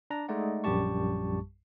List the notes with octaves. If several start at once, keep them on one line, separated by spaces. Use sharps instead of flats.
D4 A#5
G#3 A3 D#4 D5 F#5
A#1 F#2 G3 G4 A5 C#6